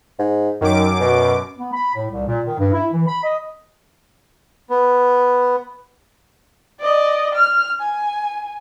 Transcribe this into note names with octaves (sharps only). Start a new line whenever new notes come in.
G#2
F#2 D#3 D6
B2
B3
B5
A2
C2
A#2
D#3
G2
E4
E3
B5
D#5
B3
D5 D#5
F6
G#5